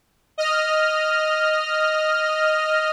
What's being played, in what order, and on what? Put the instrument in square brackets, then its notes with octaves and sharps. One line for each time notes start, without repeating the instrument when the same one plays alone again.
[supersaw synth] D#5 F6